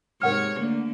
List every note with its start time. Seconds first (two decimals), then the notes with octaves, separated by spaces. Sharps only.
0.22 G#2 C3 A#4 C#5 F#5 F6
0.58 D3 A3 A#3